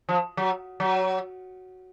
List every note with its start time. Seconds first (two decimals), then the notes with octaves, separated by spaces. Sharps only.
0.09 F3
0.37 F#3
0.80 F#3